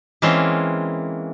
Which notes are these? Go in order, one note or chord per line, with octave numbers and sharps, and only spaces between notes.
E3 G#3 A#3 C4 C#4 F4